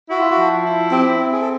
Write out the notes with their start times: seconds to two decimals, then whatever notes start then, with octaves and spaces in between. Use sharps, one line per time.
0.10 E4 F#4
0.20 F4
0.30 F#4
0.37 F3
0.64 E4
0.92 C4 G4
1.18 C4
1.33 G#4
1.40 A4